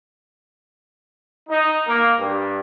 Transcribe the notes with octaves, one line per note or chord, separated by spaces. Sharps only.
D#4
A#3
G2